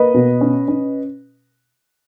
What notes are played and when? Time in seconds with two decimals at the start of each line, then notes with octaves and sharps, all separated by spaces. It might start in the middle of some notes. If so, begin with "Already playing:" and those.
Already playing: A#3 B4 D#5
0.14 B2
0.41 C#4
0.68 C#4